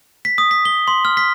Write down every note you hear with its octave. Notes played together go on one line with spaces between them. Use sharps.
B6
D#6
B6
G7
C6
F6
B6